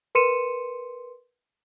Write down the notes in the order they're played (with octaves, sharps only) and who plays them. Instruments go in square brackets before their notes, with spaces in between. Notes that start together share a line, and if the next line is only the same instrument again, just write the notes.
[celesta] A#4 B4 C6 C#7 D#7 E7